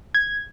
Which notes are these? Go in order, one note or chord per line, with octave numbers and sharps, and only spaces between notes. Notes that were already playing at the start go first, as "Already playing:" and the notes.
G#6